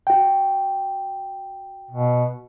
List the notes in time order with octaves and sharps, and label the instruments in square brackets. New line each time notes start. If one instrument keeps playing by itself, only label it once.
[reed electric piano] F#4 G5
[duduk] B2